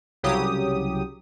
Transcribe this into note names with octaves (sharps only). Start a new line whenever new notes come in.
C2 C#3 F#3 G4 D#6